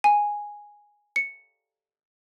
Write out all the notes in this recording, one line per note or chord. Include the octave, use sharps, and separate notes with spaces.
G#5
C#7